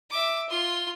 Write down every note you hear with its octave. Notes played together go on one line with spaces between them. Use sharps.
E5 D6
F4 C6